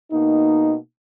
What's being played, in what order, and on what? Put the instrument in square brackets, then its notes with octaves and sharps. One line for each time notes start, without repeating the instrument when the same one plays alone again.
[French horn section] B2 A#3 D#4